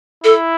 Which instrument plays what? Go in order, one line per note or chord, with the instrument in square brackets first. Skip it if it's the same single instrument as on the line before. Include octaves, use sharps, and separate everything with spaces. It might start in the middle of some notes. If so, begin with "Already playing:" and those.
[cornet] E4 [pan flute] A4